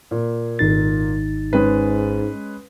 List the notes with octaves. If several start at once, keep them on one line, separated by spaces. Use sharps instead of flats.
A#2
G#1 D#4 A6
G#2 G#3 C#4 B4